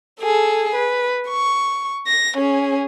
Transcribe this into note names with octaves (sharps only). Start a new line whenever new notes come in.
G#4 A4
B4
C#6
A#6
C#4 G#4